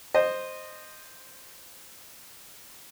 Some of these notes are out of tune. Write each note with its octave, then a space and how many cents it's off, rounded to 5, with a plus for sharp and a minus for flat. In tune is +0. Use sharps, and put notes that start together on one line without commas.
C5 +0 D#5 -15